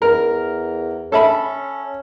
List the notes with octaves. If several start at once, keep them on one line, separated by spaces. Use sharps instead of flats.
E2 A#4
C#4 A4 E5 B5